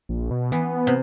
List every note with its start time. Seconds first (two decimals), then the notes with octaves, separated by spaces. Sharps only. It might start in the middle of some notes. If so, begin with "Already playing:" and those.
0.09 A#1
0.31 B2
0.52 E3 B3
0.87 C3